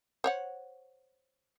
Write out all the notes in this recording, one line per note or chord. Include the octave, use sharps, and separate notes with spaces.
C5 C#5 F#5